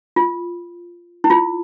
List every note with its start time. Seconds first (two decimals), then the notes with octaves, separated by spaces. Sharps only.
0.16 F4
1.24 E4
1.30 F4